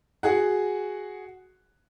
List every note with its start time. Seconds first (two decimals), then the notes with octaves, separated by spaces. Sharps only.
0.23 F#4 G#4 F#5